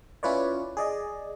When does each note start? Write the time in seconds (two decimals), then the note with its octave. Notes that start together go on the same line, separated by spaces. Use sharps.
0.23 C#4 E4 F4 B4 C#5 D5
0.77 G#4 D5 D#5